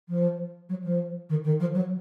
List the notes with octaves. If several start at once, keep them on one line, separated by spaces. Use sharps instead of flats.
F3
F#3
F3
D#3
D#3
F3
F#3